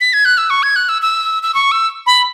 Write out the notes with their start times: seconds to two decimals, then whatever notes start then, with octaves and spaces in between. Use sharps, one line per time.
0.00 B6
0.13 G#6
0.25 F#6
0.38 E6
0.50 C#6
0.63 G#6
0.76 F#6
0.89 E6
1.02 E6
1.43 E6
1.55 C#6
1.72 E6
2.07 B5